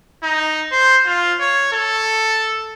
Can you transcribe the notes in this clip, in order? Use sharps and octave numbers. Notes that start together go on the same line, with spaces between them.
D#4
C5
F4
C#5
A4